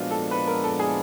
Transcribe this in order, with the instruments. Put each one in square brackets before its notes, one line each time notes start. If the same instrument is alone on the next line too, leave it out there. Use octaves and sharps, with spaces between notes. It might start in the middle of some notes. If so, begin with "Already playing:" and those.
Already playing: [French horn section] A#2 F3 G#3 B3 D4 [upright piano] F4 F#4
[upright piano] A4
B4
A#4
A4
G#4